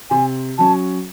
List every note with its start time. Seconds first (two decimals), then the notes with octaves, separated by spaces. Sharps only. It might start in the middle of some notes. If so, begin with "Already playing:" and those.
0.10 C3 G#5
0.58 F#3 C#4 A5